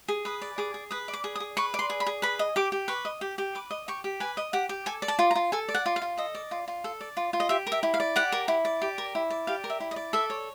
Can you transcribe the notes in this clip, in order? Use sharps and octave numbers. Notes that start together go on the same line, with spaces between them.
G#4
B4 D#6
D5
G#4 D6
G#4
B4 D#6
D5
D6
G#4
D#6
G#4
B4 C#6
D5
C6
G#4
B5
G#4
B4 B5
D#5
G4 D6
G4
B4 C#6
D#5
G4
G4
B4 D6
D#5
G4 C#6
G4
B4 G#5
D#5
G4 F#5
G4
A4 G#5
D5
A5
F4
A#5
F4
A4 G#5
D5
F#5
F4
F5
F4
A4 D#5
D5
F4
F4
A4
D5
F4
F4
D#5
G4 E5
A#4
E5
E4
F5
D5
G4 F#5
A#4
E4
D5
G4
A#4
E4
D5
G4 F5
A#4
E5
E4
D#5
D5
A4 E5
C#5